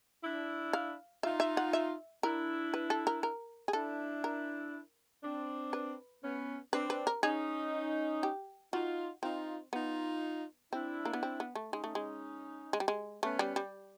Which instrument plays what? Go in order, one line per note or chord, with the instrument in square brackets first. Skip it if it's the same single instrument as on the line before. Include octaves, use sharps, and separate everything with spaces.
[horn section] D4 E4
[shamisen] F5
[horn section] D#4 F4 [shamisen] E5
[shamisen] E5
F#5
E5
[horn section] D4 E4 [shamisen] A#4
[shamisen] B4
A4
A#4
A#4
G#4
[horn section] D4 E4 [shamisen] A4
[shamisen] A#4
[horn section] C4 D4
[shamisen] B4
[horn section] B3 C#4
[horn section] C4 D4 [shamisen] B4
[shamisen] B4
A#4
[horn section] C#4 D#4 [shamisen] G#4
[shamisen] G4
[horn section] D#4 F4 [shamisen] F#4
[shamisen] C4 [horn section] D#4 F4
[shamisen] B3 [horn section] D#4 F4
[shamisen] C4 [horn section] D4 E4
[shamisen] A#3
B3
C4
B3
A3
[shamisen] G#3 [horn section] C#4 D#4
[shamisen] A3
G#3
G#3
G3
G#3
[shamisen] A3 [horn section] B3 C#4
[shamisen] G3
G3